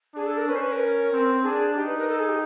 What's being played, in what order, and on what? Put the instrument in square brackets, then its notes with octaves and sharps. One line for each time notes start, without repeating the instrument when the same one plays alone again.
[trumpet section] D4 [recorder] G#4
[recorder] A4
A#4
[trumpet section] C#4 [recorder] B4
[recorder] C5
B4
A#4
[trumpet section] C4
[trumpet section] D4 [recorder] G#4
[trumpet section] D#4 [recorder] G4
[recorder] B4
A#4
A4
G#4
G4